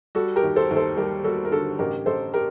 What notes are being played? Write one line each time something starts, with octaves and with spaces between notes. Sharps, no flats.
G3 F#4 A4
G4 A#4
D#2
A4 C5
D#2
A4 C5
G3 G4 A#4
G3 F#4 A4
A#4
D3 F#4 A4
A1 G4 A#4
A1 A4 C5
G4 A#4